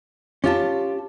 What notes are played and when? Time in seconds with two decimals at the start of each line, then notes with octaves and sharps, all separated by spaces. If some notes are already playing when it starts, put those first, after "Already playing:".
0.44 C#4 F4 G4 A5